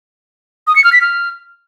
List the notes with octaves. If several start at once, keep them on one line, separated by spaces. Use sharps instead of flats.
D#6
C#7
F6
B6
F6